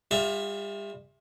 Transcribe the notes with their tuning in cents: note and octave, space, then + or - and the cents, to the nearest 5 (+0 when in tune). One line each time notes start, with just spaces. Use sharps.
G3 +40 F4 +30 E5 +0